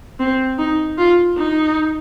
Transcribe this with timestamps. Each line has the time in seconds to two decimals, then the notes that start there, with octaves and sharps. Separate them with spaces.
0.19 C4
0.58 D#4
0.98 F4
1.38 D#4